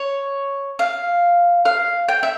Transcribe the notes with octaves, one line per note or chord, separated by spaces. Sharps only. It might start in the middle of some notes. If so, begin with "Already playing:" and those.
Already playing: C#5
F5
F5
G5
E5